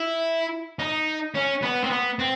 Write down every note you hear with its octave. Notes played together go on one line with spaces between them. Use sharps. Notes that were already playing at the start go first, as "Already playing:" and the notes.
Already playing: E4
D#4
C#4
B3
C4
B3
C4